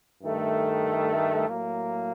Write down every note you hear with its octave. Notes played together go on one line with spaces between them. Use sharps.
G2 D#3 A3
A2 F#3 A#3